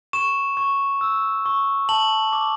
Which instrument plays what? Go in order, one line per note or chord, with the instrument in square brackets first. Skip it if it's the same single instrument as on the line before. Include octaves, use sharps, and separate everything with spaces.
[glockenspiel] C#6 E7
C#6
E6
C#6
A5 F#7
D6